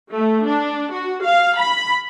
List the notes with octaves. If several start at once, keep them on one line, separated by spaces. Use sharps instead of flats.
A3
D4
F#4
F5
B5